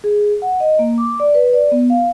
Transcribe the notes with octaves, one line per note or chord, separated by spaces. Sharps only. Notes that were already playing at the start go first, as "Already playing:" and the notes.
G#4
F#5
D#5
A#3
D6
D5
B4
D5
B3
F5